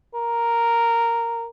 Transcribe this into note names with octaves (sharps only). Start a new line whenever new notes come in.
A#4